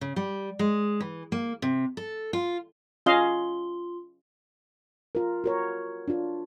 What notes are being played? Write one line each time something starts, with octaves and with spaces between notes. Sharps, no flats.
C#3
G3
G#3
E3
A#3
C3
A4
F4
C#4 F4 D#5 F5 C6 G7
F4 A#4
F#4 A#4 C#5
D4 F4